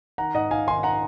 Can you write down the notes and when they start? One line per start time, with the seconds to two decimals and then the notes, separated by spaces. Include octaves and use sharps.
0.18 D#3 F#5 A#5
0.34 G#2 D#5 F#5
0.51 G#2 F5 G#5
0.67 D#3 G#5 C6
0.83 F#5 A#5